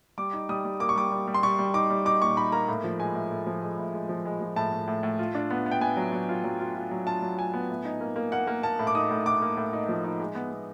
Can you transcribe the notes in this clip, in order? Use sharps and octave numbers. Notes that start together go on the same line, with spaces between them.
G3 D6
D#4
G3 D#6
G3
A#3 D6
C#6
G3 D6
G3
G3
C6
G3 C#6
G3
D#4 D6
G3
D#4 D6
A#2 C#6
D#4 B5
A#3 A#5
A2
F3
G#3 G#5
A2
A2
F3
G#3
A2
G#3
F3
G#3
F3
A2 A5
A2
A2
A2
F4
D4
B3
B3
G5
B3 G#5
F#3
F#3
F4
F#3
F4
F4
F#3
F4 A5
F#3
F4 G#5
B3
A2
D#4
A#3
A#3
A#3 F#5
A#3
A#3 A5
A2
D6
D#4 D#6
A2
A2 D6
A#3
A2
D#4
F3
D#4
G#3
B3
B3